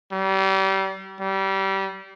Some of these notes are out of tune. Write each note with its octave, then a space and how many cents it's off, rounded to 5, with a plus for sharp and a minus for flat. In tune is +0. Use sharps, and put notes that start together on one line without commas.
G3 -30
G3 -25